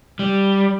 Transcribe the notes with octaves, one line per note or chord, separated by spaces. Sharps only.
G3